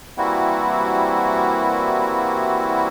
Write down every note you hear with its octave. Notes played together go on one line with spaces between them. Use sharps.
E3 G3 A#3 C4 E4 F#4